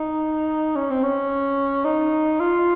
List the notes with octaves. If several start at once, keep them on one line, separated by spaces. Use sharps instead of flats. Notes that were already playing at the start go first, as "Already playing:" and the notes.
Already playing: D#4
C#4
C4
C#4
D#4
F4